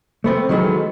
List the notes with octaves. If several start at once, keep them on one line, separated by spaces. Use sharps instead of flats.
A3 B3 C4
D#3 E3 F#3 G#3 A3 B3